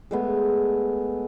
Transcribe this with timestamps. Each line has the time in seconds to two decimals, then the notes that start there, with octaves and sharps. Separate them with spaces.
0.11 G#3 A3 B3